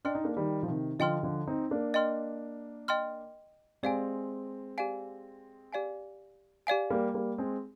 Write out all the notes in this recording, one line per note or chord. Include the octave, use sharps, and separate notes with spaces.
D4 D#5 G5 C6 F6
D#4
A#3 D4
D#3 G3
F3
C3 D#3
D3 F3 D#5 G5 C6 F6
D3 F3
C4 D#4
A#3 D4
D#5 G5 C6 F6
D#5 G5 C6 F6
G#3 C4 G4 D5 F5 G#5
G4 D5 F5 G#5
G4 D5 F5 G#5
G4 D5 F5 G#5
G3 A#3
G3 A#3
G#3 C4